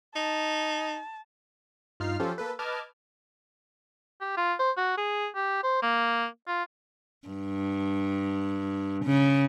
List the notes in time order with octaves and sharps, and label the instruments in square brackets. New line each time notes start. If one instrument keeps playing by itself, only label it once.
[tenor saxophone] D#4 [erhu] A5
[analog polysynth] G2 D#4 F4 F6 C7
F3 C#4 F4 G4 A4 C5
A#3 A4 B4
B4 D#5 A5 D6 F6 G#6
[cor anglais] G4
F4
C5
F#4
G#4
G4
C5
A#3
F4
[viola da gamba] G2
C#3